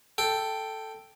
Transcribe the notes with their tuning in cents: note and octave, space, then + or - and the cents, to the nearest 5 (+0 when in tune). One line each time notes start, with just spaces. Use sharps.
A4 +0 G5 +0